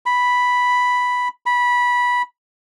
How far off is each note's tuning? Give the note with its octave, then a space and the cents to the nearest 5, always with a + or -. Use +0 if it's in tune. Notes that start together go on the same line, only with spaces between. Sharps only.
B5 +0
B5 -15